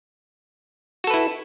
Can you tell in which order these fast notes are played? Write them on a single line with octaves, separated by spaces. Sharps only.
F#4 A4 B4 E4